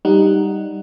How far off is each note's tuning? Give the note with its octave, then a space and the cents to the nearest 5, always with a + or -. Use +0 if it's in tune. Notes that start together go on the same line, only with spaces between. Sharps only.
G3 +0 D#4 +0 F#5 +0